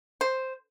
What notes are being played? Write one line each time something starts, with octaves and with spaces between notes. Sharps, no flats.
C5